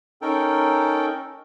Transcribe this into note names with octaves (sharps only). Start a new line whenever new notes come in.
C#4 D#4 A4 A#4 G5